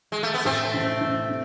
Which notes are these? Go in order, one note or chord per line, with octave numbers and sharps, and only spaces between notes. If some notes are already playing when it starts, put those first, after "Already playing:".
G#3
A3
B3
A2 A3 C4
A1
A1
C3